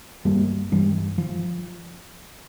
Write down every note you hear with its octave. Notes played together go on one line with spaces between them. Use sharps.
G2 G3 A#3
G2 E3 G3
F3